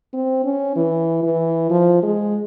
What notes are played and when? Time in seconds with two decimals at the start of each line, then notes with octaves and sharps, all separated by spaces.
0.13 C4
0.45 C#4
0.76 E3
1.23 E3
1.70 F3
2.03 G#3